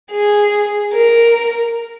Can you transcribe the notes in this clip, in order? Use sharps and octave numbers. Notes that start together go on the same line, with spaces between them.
G#4
A#4